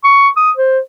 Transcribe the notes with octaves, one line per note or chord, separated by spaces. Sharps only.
C#6
D#6
C5